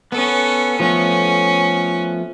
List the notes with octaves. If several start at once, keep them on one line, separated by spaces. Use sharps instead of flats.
B3 C#4 A4
F3 A3 B3 C#4